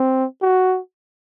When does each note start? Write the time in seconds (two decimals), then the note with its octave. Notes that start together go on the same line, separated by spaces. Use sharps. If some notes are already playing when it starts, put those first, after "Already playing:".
Already playing: C4
0.42 F#4